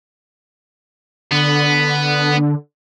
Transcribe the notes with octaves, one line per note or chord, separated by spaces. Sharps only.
D3 B3